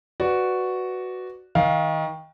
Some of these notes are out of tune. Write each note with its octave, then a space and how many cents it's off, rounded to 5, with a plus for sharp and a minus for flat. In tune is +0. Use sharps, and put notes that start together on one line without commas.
F#4 +0 B4 +0 D5 +0
D#3 +25 F5 +10